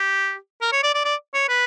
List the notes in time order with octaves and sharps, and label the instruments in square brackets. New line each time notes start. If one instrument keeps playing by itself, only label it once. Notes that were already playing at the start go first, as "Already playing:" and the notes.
Already playing: [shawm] G4
A#4
C#5
D5
D5
D5
C#5
B4